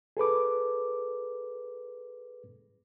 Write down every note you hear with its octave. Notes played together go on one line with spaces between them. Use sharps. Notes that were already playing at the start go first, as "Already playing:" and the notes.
G#4 A4 B4 D6